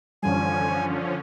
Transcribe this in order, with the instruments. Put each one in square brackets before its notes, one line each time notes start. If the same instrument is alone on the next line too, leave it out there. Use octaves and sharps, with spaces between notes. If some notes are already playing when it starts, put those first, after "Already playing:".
[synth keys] F#2 E3 G3 [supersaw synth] D3 F3 C#4 [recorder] G#5